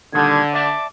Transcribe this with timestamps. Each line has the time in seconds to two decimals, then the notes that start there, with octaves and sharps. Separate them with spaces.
0.13 A#2 D3 D#3 G3 G#6
0.54 D5 E5 A5 D6